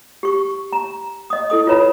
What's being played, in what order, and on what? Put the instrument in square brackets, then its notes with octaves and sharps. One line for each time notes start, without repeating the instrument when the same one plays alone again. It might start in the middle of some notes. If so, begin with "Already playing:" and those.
[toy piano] G4 C#6
A#5
D#5 D#6
E4 A4 D#6
F4 B4 C#5 A#5 B5